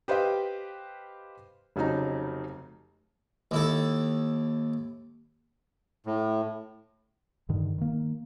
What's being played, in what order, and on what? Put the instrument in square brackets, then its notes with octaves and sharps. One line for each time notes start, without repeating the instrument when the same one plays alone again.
[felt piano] G4 B4 C5 D#5 F5 G5
F1 C#3 F#3 D#4 A#5
[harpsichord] D#2 E4 A4
[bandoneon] A2
[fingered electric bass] G2 D3 D#3
D#3 A#3